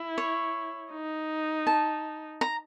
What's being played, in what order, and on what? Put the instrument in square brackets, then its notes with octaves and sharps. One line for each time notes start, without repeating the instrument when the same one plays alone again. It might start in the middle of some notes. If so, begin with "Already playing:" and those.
Already playing: [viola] E4
[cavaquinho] C#5
[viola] D#4
[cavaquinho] A5
A#5